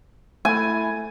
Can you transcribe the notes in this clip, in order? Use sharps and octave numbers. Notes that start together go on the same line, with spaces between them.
A3 E4 G#5